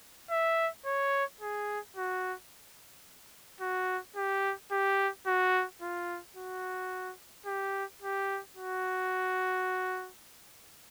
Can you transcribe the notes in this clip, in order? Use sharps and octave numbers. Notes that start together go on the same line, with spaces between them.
E5
C#5
G#4
F#4
F#4
G4
G4
F#4
F4
F#4
G4
G4
F#4